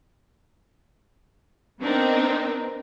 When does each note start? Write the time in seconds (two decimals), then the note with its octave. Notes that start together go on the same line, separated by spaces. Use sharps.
1.80 B3 C4 D4 D#4 A#4